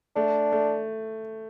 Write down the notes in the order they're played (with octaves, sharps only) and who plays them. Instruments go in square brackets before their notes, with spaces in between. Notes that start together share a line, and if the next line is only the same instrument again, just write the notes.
[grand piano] A3 [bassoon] D4
[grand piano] A3